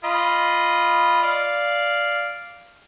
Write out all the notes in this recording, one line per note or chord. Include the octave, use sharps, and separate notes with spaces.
F4 D#5 B5
D5 F5